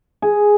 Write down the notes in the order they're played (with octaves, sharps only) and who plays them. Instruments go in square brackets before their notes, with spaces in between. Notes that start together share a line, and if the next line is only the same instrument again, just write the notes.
[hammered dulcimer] G#4